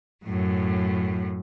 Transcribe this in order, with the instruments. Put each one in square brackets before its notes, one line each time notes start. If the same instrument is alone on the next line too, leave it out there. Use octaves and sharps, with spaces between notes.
[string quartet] F#2 A2